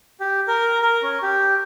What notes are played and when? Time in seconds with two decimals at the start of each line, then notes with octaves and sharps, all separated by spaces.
0.20 G4
0.48 A#4
0.82 A#4
1.03 C#4
1.22 G4